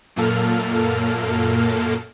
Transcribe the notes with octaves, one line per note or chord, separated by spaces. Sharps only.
F#2 A#2 A#3 A4 F6